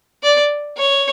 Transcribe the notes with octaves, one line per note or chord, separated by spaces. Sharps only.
D5
C#5